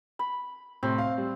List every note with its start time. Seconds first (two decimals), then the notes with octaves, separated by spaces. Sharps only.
0.19 B5
0.83 A2 C3 C4
0.98 F5
1.18 G3